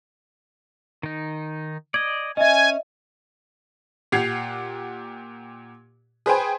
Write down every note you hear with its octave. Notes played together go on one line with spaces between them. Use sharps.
D#3 D#4
D5 D#5 G#6
C#4 D#5 E5 G#5
A#2 G4 F#5 G#6 C7 F7
G#4 B4 C5 G5 G#5